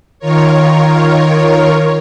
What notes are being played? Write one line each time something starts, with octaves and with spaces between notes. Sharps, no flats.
D#3 F4 A#4 C#5